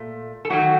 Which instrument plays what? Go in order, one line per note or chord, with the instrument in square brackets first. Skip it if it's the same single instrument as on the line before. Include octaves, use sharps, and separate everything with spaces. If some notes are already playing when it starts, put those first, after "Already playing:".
Already playing: [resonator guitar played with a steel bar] A#2 A3
A4
D#3 F#3 A3 F#4